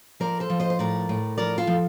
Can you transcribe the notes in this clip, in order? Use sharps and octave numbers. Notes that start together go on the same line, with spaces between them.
F3 A#4 D5
A4 C5
F3
C5 D#5
C5
A2 A#4 D5
A2
F3 A#4 D5
F4 A4
F3